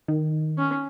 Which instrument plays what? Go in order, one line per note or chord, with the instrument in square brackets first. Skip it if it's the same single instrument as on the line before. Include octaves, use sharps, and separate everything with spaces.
[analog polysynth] D#3
[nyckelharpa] C#4